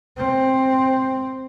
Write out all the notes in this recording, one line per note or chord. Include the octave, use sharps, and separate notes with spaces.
C4